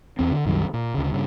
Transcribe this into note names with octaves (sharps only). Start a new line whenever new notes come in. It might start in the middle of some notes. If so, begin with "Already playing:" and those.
E2 C4
D3
C2 F#2 D#3 G3
A#2
D2 C#3
G2 C#3